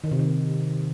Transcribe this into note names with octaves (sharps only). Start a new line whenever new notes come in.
D#3
C3
D#3